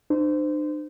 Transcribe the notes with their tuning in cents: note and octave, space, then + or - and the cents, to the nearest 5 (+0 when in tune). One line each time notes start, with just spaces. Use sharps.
D4 +45 C5 -25